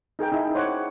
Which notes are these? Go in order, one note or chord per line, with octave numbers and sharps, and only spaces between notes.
D#4 G#4 A#4 G5
D#4 E4 G#4 E5
C5 C#5 F#5 C#6 D6